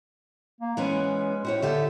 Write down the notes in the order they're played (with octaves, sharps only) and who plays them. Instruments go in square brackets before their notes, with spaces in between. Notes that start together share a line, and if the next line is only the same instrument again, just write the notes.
[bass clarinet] A#3
[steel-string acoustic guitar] E3 B3 C#4 [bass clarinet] G#3
[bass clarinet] A2 [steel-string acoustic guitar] F#4 G4 C#5
[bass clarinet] D3 [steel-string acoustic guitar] F4 G4 E5